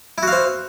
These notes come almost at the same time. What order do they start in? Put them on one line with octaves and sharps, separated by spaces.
E4 F#4 F5 C5